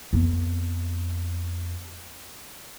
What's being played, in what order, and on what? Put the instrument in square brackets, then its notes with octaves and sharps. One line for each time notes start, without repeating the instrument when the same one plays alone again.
[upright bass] F2 B3